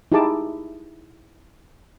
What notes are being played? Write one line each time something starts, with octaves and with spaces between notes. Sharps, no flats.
D#4 E4 G4 G#4 A5 D6